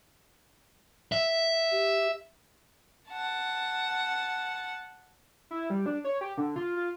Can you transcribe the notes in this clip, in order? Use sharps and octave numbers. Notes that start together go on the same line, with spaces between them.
E5
G4
F#5 A5
E4
G3
D4
C#5
G4
D3
F4
F4